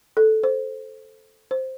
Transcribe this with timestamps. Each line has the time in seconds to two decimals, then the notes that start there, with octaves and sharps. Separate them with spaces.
0.17 A4
0.44 C5
1.51 C5